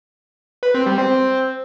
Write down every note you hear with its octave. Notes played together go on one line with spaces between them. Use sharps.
B4
C4
G3
C4